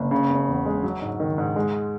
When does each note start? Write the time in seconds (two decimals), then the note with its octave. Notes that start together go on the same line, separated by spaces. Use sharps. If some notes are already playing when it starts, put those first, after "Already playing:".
Already playing: F#1
0.11 C#3
0.30 F#1
0.48 E2
0.66 G#3
0.83 F#3
1.02 G#2
1.20 D#3
1.38 G#2
1.56 G#3